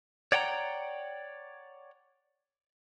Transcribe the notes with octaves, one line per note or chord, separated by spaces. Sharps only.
C#5 D5 F#5 G5 A5 A#5